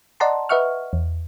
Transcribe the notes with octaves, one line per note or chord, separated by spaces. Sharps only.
D5 D#5 F#5 A5 A#5 C6
B4 D#5 E5 F#5 C#6 F6
E2